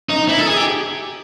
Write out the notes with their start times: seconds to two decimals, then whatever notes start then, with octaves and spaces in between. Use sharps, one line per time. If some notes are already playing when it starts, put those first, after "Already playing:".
0.10 D#4
0.29 E4
0.39 A4
0.48 G#4
0.57 G4